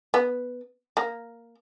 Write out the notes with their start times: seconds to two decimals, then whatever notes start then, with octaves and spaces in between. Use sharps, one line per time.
0.14 B3
0.97 A#3